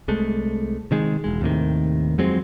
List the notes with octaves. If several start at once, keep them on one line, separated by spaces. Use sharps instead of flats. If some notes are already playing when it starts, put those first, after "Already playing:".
C2 G#3 A3
C3 D#3 G#3
E1 G#3
D#2 A2 C3 D#3
F2 F#3 G#3 C4